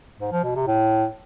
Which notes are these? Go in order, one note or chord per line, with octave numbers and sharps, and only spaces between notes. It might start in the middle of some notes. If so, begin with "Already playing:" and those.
G#2
F3
B2
C3
A2